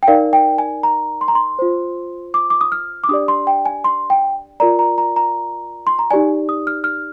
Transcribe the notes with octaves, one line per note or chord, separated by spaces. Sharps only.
G5
D#4 A#4 D5 F5
G5
G#5
A#5
C6
A#5
C6
F4 C5
D6
D6
D#6
F6
D6
D4 G4 D5 D#6
C6
G5
G#5
C6
G5
F4 A#4 D5 A#5
A#5
A#5
A#5
C6
A#5
D#4 G4 D5 G#5
D#6
F6
F6